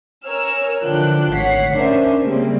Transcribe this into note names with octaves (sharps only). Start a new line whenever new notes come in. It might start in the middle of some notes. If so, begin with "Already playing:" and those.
A#4 C#5 G#5 E6 F6
D3 E3 F3 D4 G5 F#6
G#1 D2 C#5 F#5 B6 C7
C#4 D4 A#4 C5 E5
C#3 G3 G#3 A#3 C4